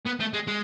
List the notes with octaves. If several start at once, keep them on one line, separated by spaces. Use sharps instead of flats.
B3
A3
G#3
G#3